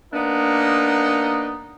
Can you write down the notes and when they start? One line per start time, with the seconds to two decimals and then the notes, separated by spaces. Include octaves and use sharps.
0.14 A#3 B3 D4 D#4